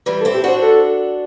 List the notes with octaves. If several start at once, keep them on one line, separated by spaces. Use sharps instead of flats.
E3 G3 B4
A4
C4 E4
G4
D4 F#4 C5
A4